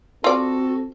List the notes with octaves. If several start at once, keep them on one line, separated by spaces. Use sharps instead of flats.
C4 F4 F#4 A4 D5